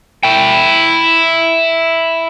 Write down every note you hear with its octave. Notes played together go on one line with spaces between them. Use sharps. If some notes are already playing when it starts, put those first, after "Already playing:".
E4 G5